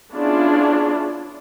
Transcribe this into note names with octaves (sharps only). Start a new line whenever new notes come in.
B3 C#4 D4 E4 F4 G#4